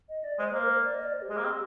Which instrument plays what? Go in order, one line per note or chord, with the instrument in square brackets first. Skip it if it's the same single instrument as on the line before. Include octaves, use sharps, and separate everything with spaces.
[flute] D#5
D5
[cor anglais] G#3 [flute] C5
[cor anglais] A#3 [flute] C5
[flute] A#4
C5
D5
D#5
D5
C5
G4
[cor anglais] G#3 [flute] G#4
[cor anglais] A#3
[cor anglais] C4 [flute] G4